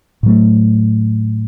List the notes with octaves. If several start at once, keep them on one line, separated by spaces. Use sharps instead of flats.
A2 F#3 A3